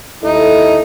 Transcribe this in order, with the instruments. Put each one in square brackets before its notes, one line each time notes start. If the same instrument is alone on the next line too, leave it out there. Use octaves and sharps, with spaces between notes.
[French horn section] D#2 E4 A4 [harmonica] D#4